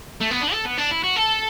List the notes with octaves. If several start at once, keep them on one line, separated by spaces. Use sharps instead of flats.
A3
B3
D4
A4
B3
D4
E4
F#4
A4